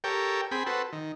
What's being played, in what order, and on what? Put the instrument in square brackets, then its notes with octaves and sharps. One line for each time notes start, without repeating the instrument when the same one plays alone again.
[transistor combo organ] G4 A4 A#4 C#5 G5
C4 G#4 G5 B5
F#4 A4 B4 C5
D#3